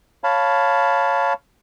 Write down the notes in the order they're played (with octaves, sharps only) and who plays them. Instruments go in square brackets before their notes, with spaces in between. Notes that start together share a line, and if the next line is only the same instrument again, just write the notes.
[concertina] C#5 F5 A5 B5